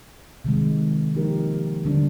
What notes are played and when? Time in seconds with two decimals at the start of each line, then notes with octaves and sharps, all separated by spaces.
0.45 C3 D#3 G#3
1.15 F3 A#3 D#4 G4 A#4
1.85 D3 G3 D4